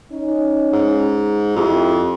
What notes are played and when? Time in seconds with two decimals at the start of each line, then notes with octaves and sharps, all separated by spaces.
0.12 C#4 D#4
0.72 G#2
1.56 F2 E4 G4